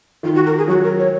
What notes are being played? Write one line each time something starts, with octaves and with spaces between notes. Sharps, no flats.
D#3 F4
F#4
A#4
G#4
F#3 F#4
A#4
C#5